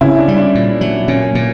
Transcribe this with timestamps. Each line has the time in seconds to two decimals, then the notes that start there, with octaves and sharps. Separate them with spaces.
0.01 C#3 C#4 E4
0.19 D4
0.28 G3
0.37 D4
0.55 A#2
0.81 F#3
1.08 A#2 C#4
1.35 A#2